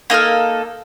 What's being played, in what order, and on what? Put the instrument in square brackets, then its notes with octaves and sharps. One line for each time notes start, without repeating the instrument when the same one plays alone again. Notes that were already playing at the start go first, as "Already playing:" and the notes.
[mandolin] A#3 D#4 A4 F6